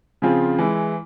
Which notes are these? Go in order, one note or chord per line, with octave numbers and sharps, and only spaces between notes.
C#3 F3 C4 F4 G#4
E3 G#3 E4